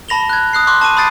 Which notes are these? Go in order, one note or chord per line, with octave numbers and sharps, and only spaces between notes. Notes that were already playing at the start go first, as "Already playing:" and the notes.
A5 B5 A#6 F7 G7
F#6 G#6
D#6 F#6 C7
C6 D6 F#6
A5 C#6 D6 D#7
B5 D#6 G6 A6 C7 D7